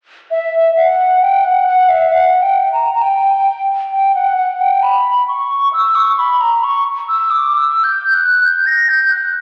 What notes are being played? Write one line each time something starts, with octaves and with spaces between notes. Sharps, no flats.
E5
F#5
G5
F#5
F#5
E5
F#5
G5
A#5
A#5
G5
G5
F#5
F#5
G5
B5
C#6
E6
C#6
B5
A#5
C#6
E6
D6
E6
G6
F#6
G6
A#6
G6
F#6